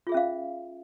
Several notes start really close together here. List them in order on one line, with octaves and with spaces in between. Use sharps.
F4 G#4 E5 C#4 F5